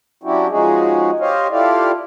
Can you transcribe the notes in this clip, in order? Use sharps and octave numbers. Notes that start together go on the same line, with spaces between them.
F#3 C#4 D4 E4 F#4 G4
F3 G#3 C#4 D#4 F#4 G#4
G4 C5 C#5 D#5 F5
E4 F4 G4 A4 D5 F5